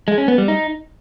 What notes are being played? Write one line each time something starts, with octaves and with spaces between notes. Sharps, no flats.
G#3
C#4
B3
G3
D#4